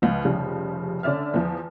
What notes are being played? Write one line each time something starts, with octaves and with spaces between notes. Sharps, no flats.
C#2 F3
F1 C#3 F3 G3
D3 C#4 D5 E5 F6
E2 F3